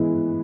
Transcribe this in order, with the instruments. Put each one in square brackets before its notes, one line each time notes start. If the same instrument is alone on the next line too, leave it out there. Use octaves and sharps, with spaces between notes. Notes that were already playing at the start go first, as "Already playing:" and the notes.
Already playing: [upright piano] E3 G#3 B3 E4